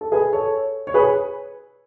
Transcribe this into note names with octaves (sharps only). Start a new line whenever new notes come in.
A4
G#4 B4
A4 C#5
C#5
G#4 B4